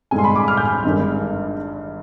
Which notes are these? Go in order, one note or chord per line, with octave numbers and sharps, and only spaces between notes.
G2 D3 G#3 G#5
C6
B5
D6
F6
G6
F6
G#1 G2 D3 G#3